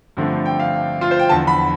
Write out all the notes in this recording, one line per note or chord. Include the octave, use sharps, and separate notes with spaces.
G2 D3 F3 A3 C4
G5
F5
F4
C5
G5
E2 D3 F3 A5
B5